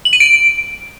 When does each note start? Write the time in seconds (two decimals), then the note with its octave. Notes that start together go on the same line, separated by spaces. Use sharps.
0.05 F#7
0.13 D#7
0.20 D7